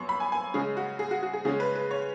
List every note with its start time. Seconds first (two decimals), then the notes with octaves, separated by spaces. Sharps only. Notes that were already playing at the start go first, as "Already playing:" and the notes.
Already playing: F#2 F#3 B3 C#6
0.09 B5
0.20 G#5
0.32 G#5
0.54 C#3 G#3 C#4 G#4
0.77 F#4
0.99 G#4
1.11 F#4
1.23 F#4
1.33 G#4
1.45 C#3 G#3 C#4 G#4
1.60 B4
1.75 B4
1.91 C#5